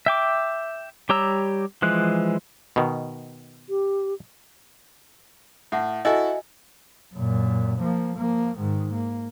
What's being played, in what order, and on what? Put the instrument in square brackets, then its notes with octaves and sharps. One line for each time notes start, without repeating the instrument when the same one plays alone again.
[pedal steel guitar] E5 G5 D6
G3 G4 C#5 A#5 E6
E3 F3 G#3 F#6
[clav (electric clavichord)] B2 D#3
[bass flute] G4
[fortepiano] A2 [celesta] E5 F#5
[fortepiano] E4 F#4 A4 [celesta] D#5 E5 G#5
[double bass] F#2 A#2
F3 A#3
F3 A#3
G#2 D#3
A#3